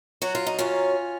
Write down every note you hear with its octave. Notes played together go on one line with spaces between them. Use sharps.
F#3 F#4
F4
D#4
F#2 C#4 F4